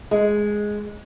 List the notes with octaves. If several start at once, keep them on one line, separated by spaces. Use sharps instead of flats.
G#3